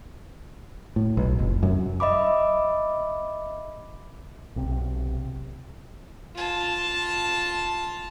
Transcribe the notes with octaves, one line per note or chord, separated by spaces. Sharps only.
A2
B1
F1
F#2
D#5 E5 B5 D6
B1 C3
F4 A5